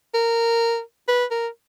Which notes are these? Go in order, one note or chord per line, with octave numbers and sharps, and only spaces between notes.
A#4
B4
A#4